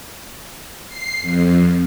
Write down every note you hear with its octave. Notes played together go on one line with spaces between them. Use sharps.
C7
F2